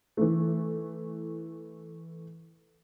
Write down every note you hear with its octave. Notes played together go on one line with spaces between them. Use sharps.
E3 A3